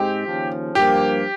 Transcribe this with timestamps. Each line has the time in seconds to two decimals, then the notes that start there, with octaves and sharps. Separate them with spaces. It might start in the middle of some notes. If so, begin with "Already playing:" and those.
Already playing: G#2 G#3 C4 G4
0.26 D#2 C#3 F3
0.75 G2 F3 A#3 G4